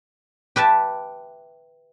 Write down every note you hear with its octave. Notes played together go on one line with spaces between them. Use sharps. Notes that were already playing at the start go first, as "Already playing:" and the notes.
G4 B4 E5 A5